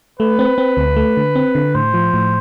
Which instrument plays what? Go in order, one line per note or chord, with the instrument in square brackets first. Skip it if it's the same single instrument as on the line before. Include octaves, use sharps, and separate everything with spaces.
[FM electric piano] A3 [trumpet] B4
[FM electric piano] C4
C4
D2
A3
D3
C4
D3
[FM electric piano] A2 [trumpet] C5
[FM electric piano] F3
A2